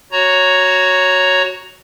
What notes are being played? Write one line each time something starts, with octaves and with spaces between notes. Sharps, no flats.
F#4 C#5 A#5